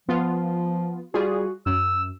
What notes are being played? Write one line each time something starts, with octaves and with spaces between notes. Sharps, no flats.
F3 B3 F4
G3 F4 F#4 G#4
F#2 E6